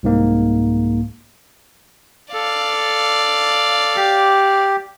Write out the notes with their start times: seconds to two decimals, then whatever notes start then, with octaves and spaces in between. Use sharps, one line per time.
0.03 C2 G#2 A#3
2.33 A4 D5 F5
3.96 G4